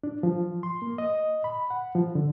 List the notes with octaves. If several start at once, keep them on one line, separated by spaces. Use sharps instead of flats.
D4
F3
C6
A#3
D#5
B5
F#5
F3
D3